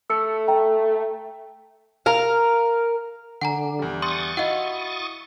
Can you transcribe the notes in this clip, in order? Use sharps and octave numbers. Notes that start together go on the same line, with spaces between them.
A3 E6 C#7
E5 G5 A#5
A#4 F5
D3 F#5 G#5 A#5
E2 G3
C6 C#6 D#6 A6
E4 F#4 D#5 F5 F#5